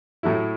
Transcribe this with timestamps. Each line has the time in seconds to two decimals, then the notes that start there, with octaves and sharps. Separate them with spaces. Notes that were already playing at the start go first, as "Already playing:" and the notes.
0.23 A2 F#3 A3 E4